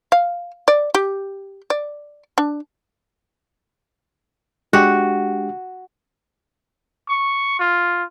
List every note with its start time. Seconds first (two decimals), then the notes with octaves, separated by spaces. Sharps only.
0.12 F5
0.68 D5
0.95 G4
1.70 D5
2.38 D4
4.73 G#3 D4 F#4 G4
7.09 C#6
7.59 F4